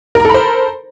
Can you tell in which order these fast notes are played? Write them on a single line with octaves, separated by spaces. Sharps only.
A#4 A#5 A4 B5 C5